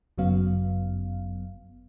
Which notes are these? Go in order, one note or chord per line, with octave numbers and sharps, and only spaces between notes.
G1 F#2 C#3 F#3 B3 F5